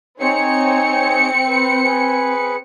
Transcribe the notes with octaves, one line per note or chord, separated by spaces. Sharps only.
C4 D#4 G#4 C#5 C#7
B4
G#4 B4